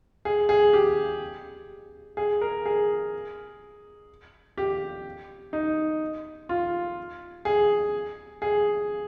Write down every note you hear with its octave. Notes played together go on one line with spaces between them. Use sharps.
G#4
G#4
G4
G#4
A#4
G#4
G4
D#4
F4
G#4
G#4